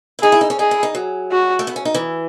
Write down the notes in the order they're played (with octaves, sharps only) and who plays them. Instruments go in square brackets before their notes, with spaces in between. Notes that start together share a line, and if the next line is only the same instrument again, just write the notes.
[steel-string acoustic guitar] E4
[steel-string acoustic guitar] D#4 [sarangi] G#4
[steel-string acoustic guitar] E4
D#4
C#4
[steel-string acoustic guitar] D#4 [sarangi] G#4
[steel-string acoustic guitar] E4
D#4
F#3
[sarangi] F#4
[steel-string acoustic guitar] A3
B3
C#4
D#4
E3